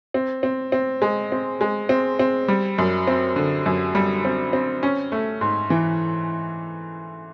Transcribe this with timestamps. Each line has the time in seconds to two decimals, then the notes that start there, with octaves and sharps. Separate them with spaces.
0.14 C4
0.43 C4
0.72 C4
1.02 G#3
1.32 C4
1.61 G#3
1.89 C4
2.19 C4
2.48 G3
2.78 F#2
3.07 C4
3.36 D3
3.66 F#2
3.95 G3
4.25 C4
4.53 C4
4.83 C#4
5.12 A3
5.41 G#2
5.70 E3